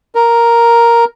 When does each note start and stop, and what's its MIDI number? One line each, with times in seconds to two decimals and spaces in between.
0.15 1.05 70